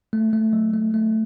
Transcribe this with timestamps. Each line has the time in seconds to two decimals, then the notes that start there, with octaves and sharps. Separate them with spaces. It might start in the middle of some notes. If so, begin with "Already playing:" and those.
0.13 A3
0.33 A3
0.53 F#3
0.73 A3
0.94 A3